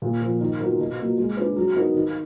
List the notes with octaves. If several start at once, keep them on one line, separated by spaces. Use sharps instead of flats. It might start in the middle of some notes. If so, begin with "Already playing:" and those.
A#2
F3 A#3 F4
D#3
F#3 B3 F4 A#4
B2
F#3 A#3 F4
G#3
D4 G#4 B4
F#3
B3 D#4 A#4
D#3